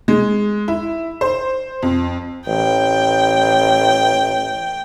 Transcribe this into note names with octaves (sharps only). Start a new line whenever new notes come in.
G#3
E4
C5
F2
A1 G5